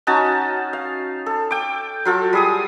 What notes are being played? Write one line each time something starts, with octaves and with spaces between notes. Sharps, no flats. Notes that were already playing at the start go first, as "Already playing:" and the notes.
C#4 D#4 F#4 A5
F5
A4
G5 D6
F#3 F4 A4
G3 G#4 D#6